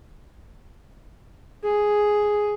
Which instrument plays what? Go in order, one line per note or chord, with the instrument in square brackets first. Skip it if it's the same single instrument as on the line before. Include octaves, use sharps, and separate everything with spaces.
[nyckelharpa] G#4